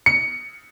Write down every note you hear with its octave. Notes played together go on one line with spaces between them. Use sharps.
C#7